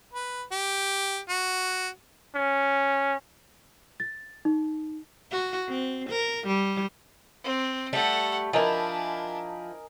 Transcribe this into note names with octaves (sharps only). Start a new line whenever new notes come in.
B4
G4
F#4
C#4
A6
D#4
F#4
C4
A#4
G3
C4
G3 A3 A4 F#5
F3 D4 E4 A#4 D#5 G#5